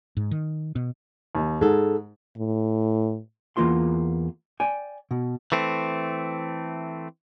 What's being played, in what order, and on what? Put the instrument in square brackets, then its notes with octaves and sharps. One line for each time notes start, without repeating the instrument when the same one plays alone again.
[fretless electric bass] G#2
D#3
B2
[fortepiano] D#2
[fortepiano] G#2 [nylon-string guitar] G#4 A4
[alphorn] A2
[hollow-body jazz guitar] E2 E3 A#3 F4 C6
D5 G5 G#5
B2
[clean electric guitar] E3 A3 C4